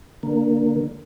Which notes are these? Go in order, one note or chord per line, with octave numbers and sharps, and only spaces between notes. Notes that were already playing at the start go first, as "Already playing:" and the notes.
D3 A#3